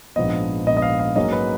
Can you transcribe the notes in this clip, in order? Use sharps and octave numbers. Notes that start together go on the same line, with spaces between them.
A#1 G#2 F3 B3 D#5
A#1 G#2 F3 B3 D#5
D#5
F5
F5
G#2 F#3 A#3 C#4 D#5
B4